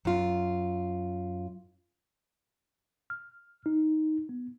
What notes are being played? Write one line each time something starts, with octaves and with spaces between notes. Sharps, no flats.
F#2 F4
F6
D#4
B3